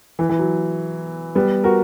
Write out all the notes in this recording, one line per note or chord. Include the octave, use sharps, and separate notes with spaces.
E3
E3
F#3
G3 B3
F#4 A#4